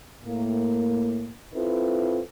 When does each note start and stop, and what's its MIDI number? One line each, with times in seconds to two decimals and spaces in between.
0.23 1.31 45
0.23 1.31 58
1.54 2.20 60
1.54 2.20 64
1.54 2.20 65
1.54 2.20 69
1.54 2.20 71